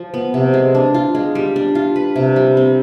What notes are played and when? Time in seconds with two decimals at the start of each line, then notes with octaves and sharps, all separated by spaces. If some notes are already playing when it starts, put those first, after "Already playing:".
Already playing: F3
0.14 B3
0.34 C3
0.54 G#3
0.75 D4
0.94 F4
1.15 G#3
1.35 G3
1.56 D4
1.75 F4
1.96 B4
2.16 C3
2.36 G3
2.57 C4